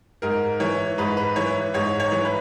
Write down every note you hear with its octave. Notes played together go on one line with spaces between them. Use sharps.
G#2 A#4
E3 C#5
G#2 B4
B4
E3 C#5
G#2 C#5
C#5
E3
B4